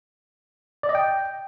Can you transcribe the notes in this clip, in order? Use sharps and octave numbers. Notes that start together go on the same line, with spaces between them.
D5
D#5
G5